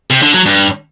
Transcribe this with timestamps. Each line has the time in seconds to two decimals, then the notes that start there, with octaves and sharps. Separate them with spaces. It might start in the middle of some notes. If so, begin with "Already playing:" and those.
0.10 C3
0.22 D3
0.34 F#3
0.46 G2